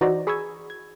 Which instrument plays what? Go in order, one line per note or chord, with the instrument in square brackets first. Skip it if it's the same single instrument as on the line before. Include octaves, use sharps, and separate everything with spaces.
[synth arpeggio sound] E3 D#4 F#4 C5 D5 A#6
G#4 B5 C#6 D#6 E6 G#6
G#6